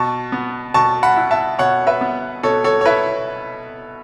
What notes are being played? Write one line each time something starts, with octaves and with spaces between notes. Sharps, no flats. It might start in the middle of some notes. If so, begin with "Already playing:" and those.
Already playing: B2 A5 C#6
B3
B2 A5 C#6
F#5 B5
E4
E5 A5
B2 C#5 F#5
B4 E5
B3
B2 A4 C#5
A4 C#5
C#5
E4 B4 E5